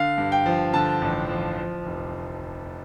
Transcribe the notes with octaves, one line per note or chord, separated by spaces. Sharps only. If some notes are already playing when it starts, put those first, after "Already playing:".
Already playing: D3 F5
G2
G5
F3
D3 A5
A1
F3
F3
F1